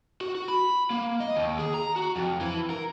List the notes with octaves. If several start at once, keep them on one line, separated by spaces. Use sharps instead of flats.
F#4
F#4
B5
A#3
D#5
D#2
G#4
A#5
F#4
F2
E3
A#4